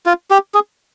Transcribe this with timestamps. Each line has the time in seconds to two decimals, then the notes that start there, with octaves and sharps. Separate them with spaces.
0.06 F4
0.31 G4
0.54 G#4